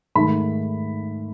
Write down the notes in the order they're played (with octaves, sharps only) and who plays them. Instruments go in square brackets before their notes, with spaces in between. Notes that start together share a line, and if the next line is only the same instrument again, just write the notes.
[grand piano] G#2 D#3 A3 B5